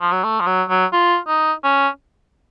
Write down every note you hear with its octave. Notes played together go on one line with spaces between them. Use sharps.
F3
F#3
A3
F3
F#3
F#3
F4
D#4
C#4